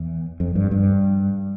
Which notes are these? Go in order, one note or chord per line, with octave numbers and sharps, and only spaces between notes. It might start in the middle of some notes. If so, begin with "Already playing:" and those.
Already playing: E2
F2
G2
G2